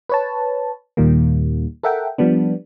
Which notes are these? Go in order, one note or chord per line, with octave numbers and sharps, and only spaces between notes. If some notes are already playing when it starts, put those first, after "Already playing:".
B4 C#5 A5
D#2 A#2 D#3 G3 A#3
A4 A#4 E5 F#5 G5
F3 G3 B3 D4